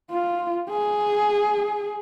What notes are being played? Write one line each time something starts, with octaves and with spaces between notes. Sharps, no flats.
F4
G#4